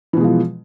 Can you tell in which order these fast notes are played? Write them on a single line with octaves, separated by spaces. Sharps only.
E3 B2 G#3 F3